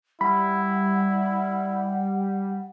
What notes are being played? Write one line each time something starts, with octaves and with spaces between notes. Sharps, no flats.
G3 E4 F#5 B5